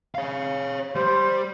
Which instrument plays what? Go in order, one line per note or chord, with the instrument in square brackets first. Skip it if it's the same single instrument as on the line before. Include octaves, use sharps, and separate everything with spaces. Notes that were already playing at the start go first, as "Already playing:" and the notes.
[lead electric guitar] C#5 F5
[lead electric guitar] G3 G4 [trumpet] C5